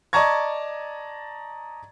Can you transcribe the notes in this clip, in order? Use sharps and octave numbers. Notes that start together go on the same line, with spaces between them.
D5 D#5 A5 A#5 C#6 G#6